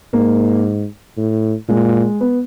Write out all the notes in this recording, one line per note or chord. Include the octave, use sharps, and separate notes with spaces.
G#2 A#3
A2
A#2 G#3
B3